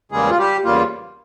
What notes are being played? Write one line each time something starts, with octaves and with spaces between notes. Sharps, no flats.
E2 C#3 G3 G#3 A#3 G#4
F4
G3 G4
E2 C#3 G3 A#3 F4